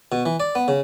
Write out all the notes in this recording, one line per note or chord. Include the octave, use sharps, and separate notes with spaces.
B2
E3
D5
B3
C#3